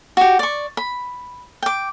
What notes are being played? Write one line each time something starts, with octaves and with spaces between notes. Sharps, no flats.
F#4 G4
D5 C#6
B5
G5 D6